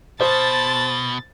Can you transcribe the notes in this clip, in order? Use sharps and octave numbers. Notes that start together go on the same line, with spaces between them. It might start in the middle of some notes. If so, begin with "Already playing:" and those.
B2 C5 A5 A6